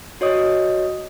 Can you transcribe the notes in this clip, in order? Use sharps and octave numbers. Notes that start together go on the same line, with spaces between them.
F#4 C#5 D#5 D#6